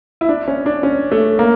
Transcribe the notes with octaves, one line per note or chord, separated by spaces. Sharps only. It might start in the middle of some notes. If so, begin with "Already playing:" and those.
E4
D4
C#4
D4
C#4
A3
A#3